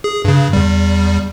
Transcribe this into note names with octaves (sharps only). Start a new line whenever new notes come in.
G#4
G2 C#3
E2 G3